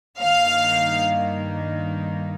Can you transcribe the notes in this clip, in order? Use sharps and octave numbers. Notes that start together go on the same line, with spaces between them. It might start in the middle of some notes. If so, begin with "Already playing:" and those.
G2 D#3 A#3 D#4 F5